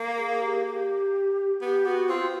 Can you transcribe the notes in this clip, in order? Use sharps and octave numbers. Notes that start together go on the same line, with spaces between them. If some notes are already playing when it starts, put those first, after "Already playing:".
Already playing: A#3
G#4
G4
G4
B3 G4
B3 F#4
C4 F4